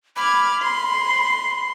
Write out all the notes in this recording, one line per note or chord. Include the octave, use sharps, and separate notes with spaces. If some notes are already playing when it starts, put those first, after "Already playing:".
B5 D6 F6 G#6
C6